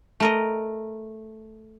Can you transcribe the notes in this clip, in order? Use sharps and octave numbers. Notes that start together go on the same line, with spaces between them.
A3 A#4 D#5